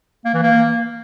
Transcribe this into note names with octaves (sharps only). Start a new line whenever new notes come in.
A#3
E3
A#3